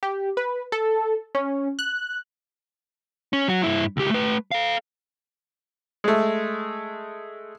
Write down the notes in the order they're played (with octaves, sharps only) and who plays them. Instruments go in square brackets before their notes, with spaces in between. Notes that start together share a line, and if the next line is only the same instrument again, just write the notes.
[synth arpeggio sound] G4
B4
A4
C#4
F#6
[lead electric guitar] C#4
F#3 F#4
G2 E4
C#2 G4
A3 B4
A4 F5
[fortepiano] G#3 A3